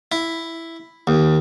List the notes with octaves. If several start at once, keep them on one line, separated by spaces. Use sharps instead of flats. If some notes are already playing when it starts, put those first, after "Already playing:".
E4
D#2